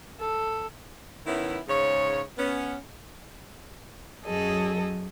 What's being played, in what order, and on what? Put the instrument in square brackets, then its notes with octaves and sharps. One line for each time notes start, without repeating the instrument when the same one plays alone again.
[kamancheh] A4
[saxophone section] D#3 B3 C#4 E4
G#2 C#3 C#5
B3 C#4
[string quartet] F#2 F#3 G#4 A4 D#5